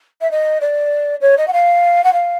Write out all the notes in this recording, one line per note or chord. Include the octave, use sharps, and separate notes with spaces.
E5
D#5
D5
C#5
D#5
F#5
F5
F#5
F5